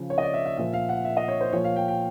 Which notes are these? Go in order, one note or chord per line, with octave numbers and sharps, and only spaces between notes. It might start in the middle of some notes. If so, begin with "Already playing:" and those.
Already playing: C#3 F3
C#5
D#5
D5
E5
E5
A#2 F3 E5
F5
F#5
E5
D#5
C#5
C5
A#2 F3 C#5
F5
G5
G5